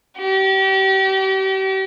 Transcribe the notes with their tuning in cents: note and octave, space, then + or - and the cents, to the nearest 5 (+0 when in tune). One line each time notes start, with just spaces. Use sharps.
G4 -35